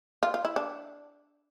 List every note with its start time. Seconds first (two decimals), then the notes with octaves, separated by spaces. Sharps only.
0.23 F4
0.34 F4
0.45 E4
0.56 D4